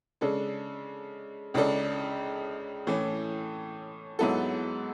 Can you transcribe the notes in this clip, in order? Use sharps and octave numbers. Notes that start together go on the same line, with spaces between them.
C#3 G#3 D4 A4
C#2 C#3 G#3 D4 A4
A2 E3 A3 C#4
G#2 F#3 B3 E4 A4